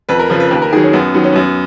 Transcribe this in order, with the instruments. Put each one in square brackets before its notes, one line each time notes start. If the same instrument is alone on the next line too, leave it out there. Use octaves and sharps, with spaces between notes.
[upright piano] F2 B4
A#4
C#3 F3 B4
B4
D#2 B4
A#4
D#3 F#3 G#4
C#4
F#2 B3
D#3 F#3 B3
C#4
F#2 B3